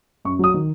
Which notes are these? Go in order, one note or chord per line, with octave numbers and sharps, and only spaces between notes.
F#2 C#6
F#3 D#6
D#3